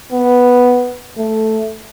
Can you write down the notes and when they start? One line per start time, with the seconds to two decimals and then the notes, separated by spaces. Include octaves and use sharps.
0.12 B3
1.18 A3